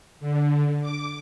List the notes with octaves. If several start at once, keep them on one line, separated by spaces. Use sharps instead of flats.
D3
D6